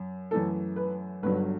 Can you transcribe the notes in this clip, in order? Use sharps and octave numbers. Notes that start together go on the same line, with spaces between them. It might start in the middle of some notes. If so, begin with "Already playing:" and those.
Already playing: F#2
F#2 E3 A3 A4
B4
G1 G2 F#3 B4